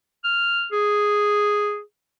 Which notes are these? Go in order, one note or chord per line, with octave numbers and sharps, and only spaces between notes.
F6
G#4